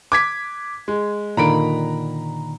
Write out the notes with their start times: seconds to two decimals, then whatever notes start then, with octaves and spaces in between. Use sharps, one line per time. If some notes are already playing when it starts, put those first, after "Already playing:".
0.12 D6 G#6 B6
0.88 G#3
1.37 A#2 D3 D#3 A#5 B5 D7